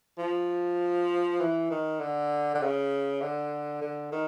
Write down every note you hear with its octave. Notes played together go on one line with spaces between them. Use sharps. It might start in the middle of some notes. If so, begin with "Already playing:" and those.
F3
E3
D#3
D3
D3
C#3
D3
D3
D#3